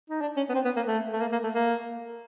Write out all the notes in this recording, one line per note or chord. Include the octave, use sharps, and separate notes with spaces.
D#4
D4
C#4
B3
C4
B3
A#3
A3
A3
A#3
A#3
A3
A#3